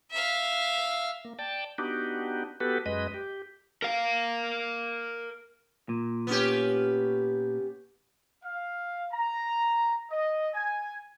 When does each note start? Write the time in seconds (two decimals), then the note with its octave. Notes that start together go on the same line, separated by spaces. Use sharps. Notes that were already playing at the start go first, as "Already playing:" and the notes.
0.11 E5 F5
1.25 A#3
1.39 D5 G5 A5
1.78 B3 D4 D#4 F#4 G4
2.60 B3 F#4 G4 A4 B4
2.86 F#2 G#3 B4 D#5
3.14 G4
3.82 A#4 F5
5.89 A#2
6.27 B3 C#4 G4
8.44 F5
9.12 A#5
10.11 D#5
10.54 G#5